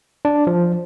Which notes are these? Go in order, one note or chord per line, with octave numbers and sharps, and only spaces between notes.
D4
F3